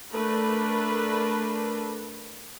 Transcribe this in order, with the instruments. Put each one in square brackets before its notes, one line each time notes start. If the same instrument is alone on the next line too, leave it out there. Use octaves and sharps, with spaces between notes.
[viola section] A3 D4 A#4 B4